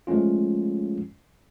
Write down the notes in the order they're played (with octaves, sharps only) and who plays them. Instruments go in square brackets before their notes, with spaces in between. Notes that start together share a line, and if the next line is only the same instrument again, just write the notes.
[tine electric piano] F3 G#3 A3 C#4 F4